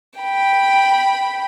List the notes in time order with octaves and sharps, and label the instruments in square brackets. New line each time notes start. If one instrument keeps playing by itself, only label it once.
[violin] G5 B5